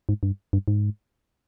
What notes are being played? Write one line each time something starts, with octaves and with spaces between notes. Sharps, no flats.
G#2
G2
G2
G#2